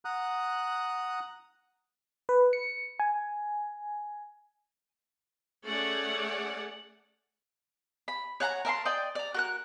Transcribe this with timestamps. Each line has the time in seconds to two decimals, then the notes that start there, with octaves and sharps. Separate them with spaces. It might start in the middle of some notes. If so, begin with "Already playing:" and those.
0.05 F#5 A#5 D#6 F#6
2.29 B4
2.53 C#7
3.00 G#5
5.66 A3 C#4 G#4 C#5 D5 F#5
8.08 B5
8.40 C#5 F#5 A5 A#5
8.65 A#4 E5 A5 C6
8.85 D5 D#5 G5
9.15 D5 A#5
9.34 F#4 A#4 F#6